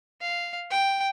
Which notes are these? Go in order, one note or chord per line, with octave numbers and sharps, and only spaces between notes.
F5
G5